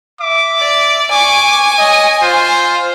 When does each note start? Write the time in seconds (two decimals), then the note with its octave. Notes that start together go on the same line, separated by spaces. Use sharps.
0.19 E5 D6
0.59 D5
1.11 G#5 C#6 D6
1.79 C#5 D#5
2.21 F4 C5